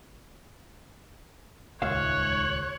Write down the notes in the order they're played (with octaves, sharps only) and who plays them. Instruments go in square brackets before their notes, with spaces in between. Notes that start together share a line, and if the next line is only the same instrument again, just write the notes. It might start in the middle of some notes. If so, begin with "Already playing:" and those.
[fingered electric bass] D#1 C#2 [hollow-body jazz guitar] G#2 E5 F5 [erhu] C#5 [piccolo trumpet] F#6